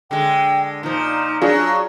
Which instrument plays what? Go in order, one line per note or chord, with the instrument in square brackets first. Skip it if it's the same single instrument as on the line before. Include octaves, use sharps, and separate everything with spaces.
[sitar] D3 G#3 [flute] G5
[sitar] A#2 F3 [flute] D#4
[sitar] F#3 [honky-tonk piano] D4 F4 G#4